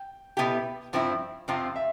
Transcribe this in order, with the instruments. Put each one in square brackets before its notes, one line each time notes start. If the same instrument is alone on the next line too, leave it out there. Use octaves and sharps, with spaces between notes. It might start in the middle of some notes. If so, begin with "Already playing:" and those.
Already playing: [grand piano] G5
[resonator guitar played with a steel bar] B2 B3 E4 G4
G2 F3 C4 E4
[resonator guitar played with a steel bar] F2 C3 F3 C4 F4 [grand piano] F5
[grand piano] E5